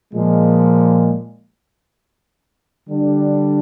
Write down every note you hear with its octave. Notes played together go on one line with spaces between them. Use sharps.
A#2 F3 G#3
D3 G3 D4